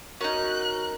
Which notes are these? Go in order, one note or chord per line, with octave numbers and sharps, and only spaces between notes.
C#4 D#4 F#4 A#4 F#6